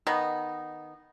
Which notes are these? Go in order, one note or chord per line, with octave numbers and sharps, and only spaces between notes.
D#3 B3 D#4